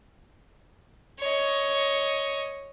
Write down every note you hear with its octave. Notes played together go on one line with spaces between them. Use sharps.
C#5 D#5